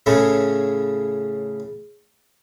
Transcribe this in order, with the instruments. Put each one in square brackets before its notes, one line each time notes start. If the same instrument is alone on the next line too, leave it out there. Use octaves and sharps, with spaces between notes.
[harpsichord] A2 C#3 A3